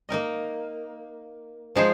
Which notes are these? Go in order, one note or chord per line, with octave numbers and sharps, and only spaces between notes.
A#3 D#4 A#4 D#5
F3 G#3 D#4 G#4 C5